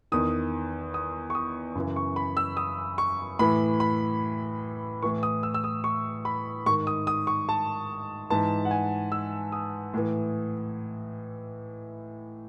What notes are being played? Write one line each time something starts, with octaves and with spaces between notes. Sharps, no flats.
E2 D#3 D#6
D#6
C#6
D#6
F#2 C#3 E3
C#6
B5
E6
D#6
C#6
A2 E3 B5
B5
A2 E3 C#6
D#6
E6
E6
D#6
C#6
B5
G#2 D#3 C#6
D#6
D#6
C#6
A5
G#2 E3 A5
F#5
G#5
E6
D#6
A2 E3